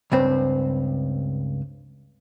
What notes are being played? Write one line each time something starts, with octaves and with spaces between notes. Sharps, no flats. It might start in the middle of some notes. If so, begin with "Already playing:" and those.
C#2 G2 C4